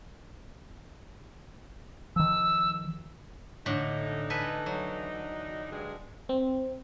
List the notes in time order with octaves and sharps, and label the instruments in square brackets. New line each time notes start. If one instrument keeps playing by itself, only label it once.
[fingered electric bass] D#3 F3 [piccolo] E6
[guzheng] A2 D3 [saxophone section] E3 D4 D#4
[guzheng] A4 B4 G#5
F#3
[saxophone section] G2 G#3
[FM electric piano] C4